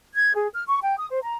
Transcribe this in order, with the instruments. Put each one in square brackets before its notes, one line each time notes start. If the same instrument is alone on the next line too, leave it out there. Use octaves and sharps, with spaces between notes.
[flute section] G#6
G#4
F6
C#6
G5
D#6
C5
A#5